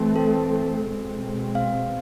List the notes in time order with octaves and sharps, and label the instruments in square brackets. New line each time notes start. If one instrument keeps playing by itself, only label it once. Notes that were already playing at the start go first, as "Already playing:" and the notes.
Already playing: [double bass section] E3 A3 C4
[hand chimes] A4
[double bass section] B2 G#3 C4
[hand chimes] F5